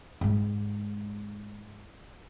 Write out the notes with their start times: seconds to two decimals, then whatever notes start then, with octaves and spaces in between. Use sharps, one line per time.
0.21 G#2 G#3